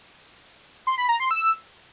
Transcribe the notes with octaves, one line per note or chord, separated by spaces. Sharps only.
C6
B5
A#5
C6
E6